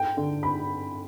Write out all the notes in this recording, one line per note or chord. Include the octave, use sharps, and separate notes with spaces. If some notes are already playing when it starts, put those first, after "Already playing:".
Already playing: G5
D3
B5